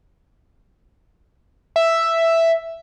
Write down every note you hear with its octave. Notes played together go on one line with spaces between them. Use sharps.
E5